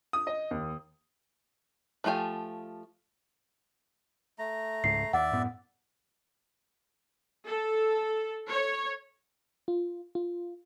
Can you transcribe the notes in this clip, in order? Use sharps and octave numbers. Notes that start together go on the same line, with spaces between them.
D#6
D#5
D#2
F3 A3 F4 G4 G#5
A3 A#5
C#2 G#2 C7
D#2 D5 E5 F#5
F#2 A2 B3
A4
C#5
F4
F4